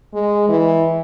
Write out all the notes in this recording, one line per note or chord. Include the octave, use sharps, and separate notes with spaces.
G#3
E3